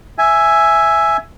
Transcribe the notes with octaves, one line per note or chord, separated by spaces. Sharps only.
E5 G#5